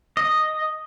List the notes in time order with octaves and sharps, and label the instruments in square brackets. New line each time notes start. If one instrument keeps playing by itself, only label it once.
[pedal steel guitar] D#5